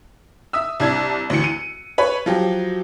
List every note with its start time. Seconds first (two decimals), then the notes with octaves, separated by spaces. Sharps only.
0.53 E5 D#6 E6
0.80 C2 D4 E4 G#6
1.30 D2 E3 C#7
1.44 D#7
1.98 B4 C#5 B5
2.26 F3 F#3 G4